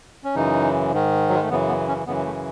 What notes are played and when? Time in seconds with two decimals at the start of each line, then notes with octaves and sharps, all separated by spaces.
0.24 C#4
0.35 F#2 C#3 E3 D#4
0.92 G#2 D#3
1.29 F#3
1.35 G#3
1.42 A3
1.49 F#2 C#3 E3 B3
1.68 B3
1.88 C#4
2.06 F#2 C#3 E3 B3
2.26 A3